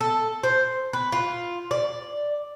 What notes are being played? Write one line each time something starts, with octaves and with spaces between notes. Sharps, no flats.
A4
C5
B4
F4
D5